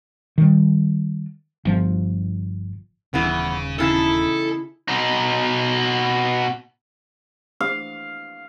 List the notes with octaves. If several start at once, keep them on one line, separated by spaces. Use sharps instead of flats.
D#3 G3
G1 F3
D#1 C#3 E3 B3
E2 C#3 D#4 E4 A4
B2 D#4
F5